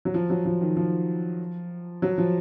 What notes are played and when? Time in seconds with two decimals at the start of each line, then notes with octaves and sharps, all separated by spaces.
0.05 F#3
0.14 F3
0.30 F#3
0.46 F3
0.61 D#3
0.77 F3
2.02 F#3
2.18 F3